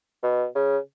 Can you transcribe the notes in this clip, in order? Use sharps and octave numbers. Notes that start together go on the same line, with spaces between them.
B2
C#3